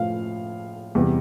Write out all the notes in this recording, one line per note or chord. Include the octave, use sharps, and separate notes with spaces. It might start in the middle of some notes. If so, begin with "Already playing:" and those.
Already playing: A2 F3 F5
E2 C3 G3